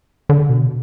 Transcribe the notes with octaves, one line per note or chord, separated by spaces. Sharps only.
D3
B2